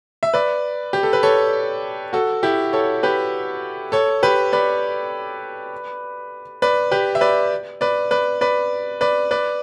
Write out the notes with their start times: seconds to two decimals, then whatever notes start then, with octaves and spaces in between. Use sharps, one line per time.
0.23 E5
0.34 B4 D5
0.93 G4
1.03 A4
1.13 B4
1.23 A4 C#5
2.13 F#4 A4
2.43 E4 G4
2.73 A4 C#5
3.03 G4 B4
3.92 A4 C#5
4.23 G4 B4
4.53 B4 D5
6.62 B4 D5
6.91 G4 B4
7.15 E5
7.21 B4 D5
7.81 B4 D5
8.11 B4 D5
8.41 B4 D5
9.01 B4 D5
9.31 B4 D5